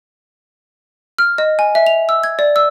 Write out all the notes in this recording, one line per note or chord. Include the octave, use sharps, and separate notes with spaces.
F6
D#5
G#5
E5
F7
E6
G#6
D5
E6